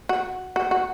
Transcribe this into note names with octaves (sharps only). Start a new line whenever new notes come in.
F#4
F#4
F#4